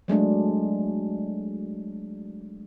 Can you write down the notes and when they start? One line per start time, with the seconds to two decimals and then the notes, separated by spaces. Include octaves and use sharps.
0.08 F#3 G#3 A3 D4